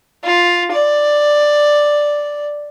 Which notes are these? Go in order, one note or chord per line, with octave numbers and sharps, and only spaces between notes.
F4
D5